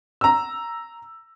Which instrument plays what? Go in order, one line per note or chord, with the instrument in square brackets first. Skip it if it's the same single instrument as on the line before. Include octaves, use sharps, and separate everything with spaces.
[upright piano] A#5 E6